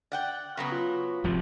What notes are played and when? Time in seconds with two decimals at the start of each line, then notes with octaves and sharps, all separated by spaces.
0.12 D5 F#5 G5
0.57 C#3 F#3 B3
0.72 F4
1.24 F1 C3 F3